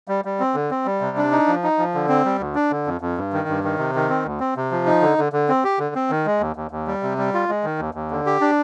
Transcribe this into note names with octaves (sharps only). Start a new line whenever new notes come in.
G3
G3
C4
D3
C4
G3
C3
D4
D#4
F3
D#4
F3
D3
C4
G3
D2
D4
D3
F2
F2
G2
D#3
G2
D#3
C3
D#3
C4
D2
C4
C3
F3
D#4
D3
D3
D3
C4
G4
D3
C4
D#3
G#3
D#2
D#2
D#2
G3
C3
G3
F4
G#3
D#3
D#2
D#2
D3
G4
D4